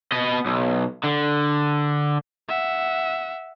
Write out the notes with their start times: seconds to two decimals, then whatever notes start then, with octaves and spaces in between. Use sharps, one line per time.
0.12 B3 D#5
0.46 B1
1.04 D3
2.48 E5 F#5